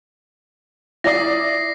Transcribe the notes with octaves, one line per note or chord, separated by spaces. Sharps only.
E4 D5 D#6 A#6 C7